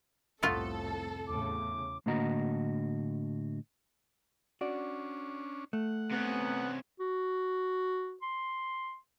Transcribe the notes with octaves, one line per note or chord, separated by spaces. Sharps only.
C2 F2 A2 A3 B3 F4 A4
E2 A2 C#3 D6
A2 D3 A#3 F#4 D#5 A#5
C#4 D4 F#4 D5
A3 F#5
C3 B3 C#4
F#4
C6